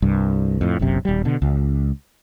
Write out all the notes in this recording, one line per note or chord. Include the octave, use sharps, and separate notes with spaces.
C2 G2
F2 A2
F#1 B1 F#2 C3
D#1 G3
B2 D3
C#2